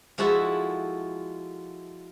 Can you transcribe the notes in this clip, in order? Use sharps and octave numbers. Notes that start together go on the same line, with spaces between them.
F3 G#3 E4 F#4 A4 E5